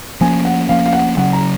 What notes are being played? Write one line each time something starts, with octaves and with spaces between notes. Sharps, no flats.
F3 A#3 C#4 G#5
F#5
F3 A#3 C#4 F5
F5
F#5
C#3 F#3 C#4 F#5
A#5